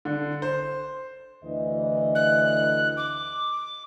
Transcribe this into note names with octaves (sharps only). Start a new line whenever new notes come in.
D3
C5
D2 E3 D#5
F#6
D6